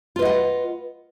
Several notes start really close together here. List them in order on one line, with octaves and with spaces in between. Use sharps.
F4 B4 D#5 F#5